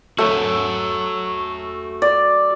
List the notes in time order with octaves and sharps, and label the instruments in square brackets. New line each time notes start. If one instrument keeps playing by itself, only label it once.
[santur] A3 [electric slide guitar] F#4 C#5 E5
[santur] D5